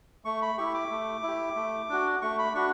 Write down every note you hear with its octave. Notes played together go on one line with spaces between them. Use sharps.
A3 C#6
B5
E4 G4 C#6
D6
A3
E4 G4
A3
D4 F#4
A3 C#6
B5
D4 F#4 C#6